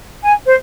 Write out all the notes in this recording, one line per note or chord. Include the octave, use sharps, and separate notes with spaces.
G#5
C5